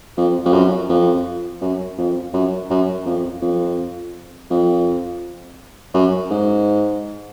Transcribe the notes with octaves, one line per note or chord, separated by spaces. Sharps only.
F2
F2
F#2
F2
F#2
F2
F#2
F#2
F2
F2
F2
F#2
G#2